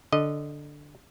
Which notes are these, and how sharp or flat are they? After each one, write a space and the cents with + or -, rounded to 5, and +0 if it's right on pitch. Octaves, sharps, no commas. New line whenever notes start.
D3 +0 D#5 -10